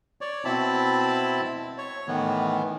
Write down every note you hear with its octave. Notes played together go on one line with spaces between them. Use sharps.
C#5 D5
B2 C4 E4 A5 B5
C#5
A2 D#3 E3 B3